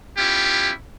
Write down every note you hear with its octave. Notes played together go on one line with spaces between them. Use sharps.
B3 C#4 E4 F4 G4